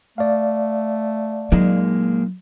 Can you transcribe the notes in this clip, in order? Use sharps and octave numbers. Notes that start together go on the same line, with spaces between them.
A3 D5 F5
A#2 F#3 G#3 A#3 D#4